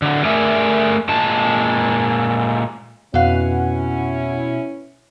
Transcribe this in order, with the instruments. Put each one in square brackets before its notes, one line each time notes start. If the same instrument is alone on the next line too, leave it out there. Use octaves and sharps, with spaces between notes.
[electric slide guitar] D3 F#3
A3 G#4 A#4 D5 E5 G#5
A#2 G#3 A5
[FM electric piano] F2 F#5 [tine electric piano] B2 [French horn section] C#4 E4 [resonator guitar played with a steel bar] B4 F5